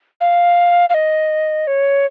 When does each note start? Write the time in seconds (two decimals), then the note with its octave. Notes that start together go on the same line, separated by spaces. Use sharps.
0.21 F5
0.89 F5
0.94 D#5
1.67 C#5